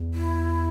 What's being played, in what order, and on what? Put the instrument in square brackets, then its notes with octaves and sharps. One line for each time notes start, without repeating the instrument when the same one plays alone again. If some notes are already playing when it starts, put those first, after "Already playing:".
Already playing: [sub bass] E2
[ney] E4